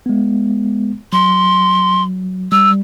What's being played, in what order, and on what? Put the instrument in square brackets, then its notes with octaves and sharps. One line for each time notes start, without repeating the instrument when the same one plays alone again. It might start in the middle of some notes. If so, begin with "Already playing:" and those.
[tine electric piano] G#3 B3
[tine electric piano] F#3 [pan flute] C6
[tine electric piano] G3 [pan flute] E6